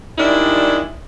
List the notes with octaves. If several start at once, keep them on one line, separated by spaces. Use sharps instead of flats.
D#3 G3 G#3 D4 E4